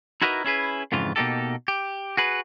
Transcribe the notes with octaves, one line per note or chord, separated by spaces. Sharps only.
D#4 E4 F#4 A#4 B4 D#5
C#4 E4 G#4 B4
F2 G#2 C#3 E3 F4
B2 A#3 D#4 G4 A4
G4
F#4 G#4 B4